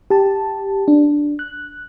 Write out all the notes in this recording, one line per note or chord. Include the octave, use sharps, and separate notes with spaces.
G4 A5
D4
F#6